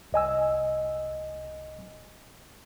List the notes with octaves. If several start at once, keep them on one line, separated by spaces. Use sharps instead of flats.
C2 D#5 G#5 E6